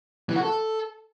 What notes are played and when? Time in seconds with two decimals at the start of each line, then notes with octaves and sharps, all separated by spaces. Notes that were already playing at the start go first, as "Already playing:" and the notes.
0.29 E3
0.36 F#4
0.42 A4